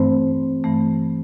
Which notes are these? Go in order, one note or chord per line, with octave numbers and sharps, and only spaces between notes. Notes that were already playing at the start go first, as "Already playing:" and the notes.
Already playing: G2 E3 A3 C4 C5
G2 E3 A3